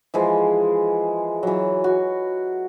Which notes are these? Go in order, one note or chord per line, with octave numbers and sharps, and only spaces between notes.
E3 F3 G#3
E3 F#3
F#4